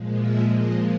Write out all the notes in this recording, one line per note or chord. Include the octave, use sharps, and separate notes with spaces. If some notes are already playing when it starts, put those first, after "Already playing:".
Already playing: A#2 F3 G#3
E5
D#5